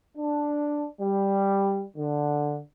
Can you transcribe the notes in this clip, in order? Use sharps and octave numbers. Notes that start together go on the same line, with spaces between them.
D4
G3
D3